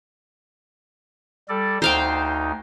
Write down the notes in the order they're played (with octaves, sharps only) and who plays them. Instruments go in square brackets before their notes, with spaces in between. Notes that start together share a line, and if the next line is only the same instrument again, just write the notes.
[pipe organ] G3 A4 D5
[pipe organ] D2 D#4 [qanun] C5 F5 G5